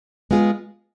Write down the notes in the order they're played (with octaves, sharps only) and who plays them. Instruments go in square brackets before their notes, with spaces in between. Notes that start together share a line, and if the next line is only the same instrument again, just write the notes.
[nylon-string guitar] G#3 B3 F4 G#4